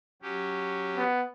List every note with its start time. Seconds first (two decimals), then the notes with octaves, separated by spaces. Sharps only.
0.22 F#3 C#4 G4
0.97 B3